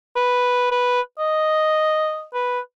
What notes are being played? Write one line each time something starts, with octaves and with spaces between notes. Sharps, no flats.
B4
B4
D#5
B4